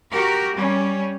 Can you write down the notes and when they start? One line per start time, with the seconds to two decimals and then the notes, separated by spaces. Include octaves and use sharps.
0.12 F#4 G4 A#4
0.55 G3 C#4